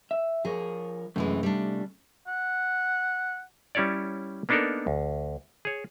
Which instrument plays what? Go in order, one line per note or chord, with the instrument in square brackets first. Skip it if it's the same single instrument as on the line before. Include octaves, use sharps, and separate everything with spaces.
[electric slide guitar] E5
[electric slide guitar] F3 A#4 C#5 [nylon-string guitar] G#4
[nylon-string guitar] F#2 E3 G#3 [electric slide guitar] C3 A3
[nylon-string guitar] G3 D4
[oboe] F#5
[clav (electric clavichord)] G3 C#4 E4 C#5 D5
A#3 B3 D4 D#4 A4 A#4
D2
G#4 C#5